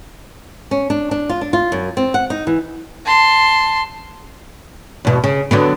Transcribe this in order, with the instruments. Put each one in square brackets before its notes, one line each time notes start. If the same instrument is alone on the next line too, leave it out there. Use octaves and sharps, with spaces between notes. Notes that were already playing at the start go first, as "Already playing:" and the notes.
[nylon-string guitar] C#4
D4
D4
F4
D4
F4
F#2
C4
F#5
D#4
E3
[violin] A5 C6
[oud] E2 B2
C#3
D3 F#3 B3